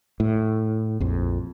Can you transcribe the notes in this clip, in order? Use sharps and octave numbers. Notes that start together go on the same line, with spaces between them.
A2
A#1 F2